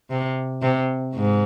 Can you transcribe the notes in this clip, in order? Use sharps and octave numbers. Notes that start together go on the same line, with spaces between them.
C3
C3
G#2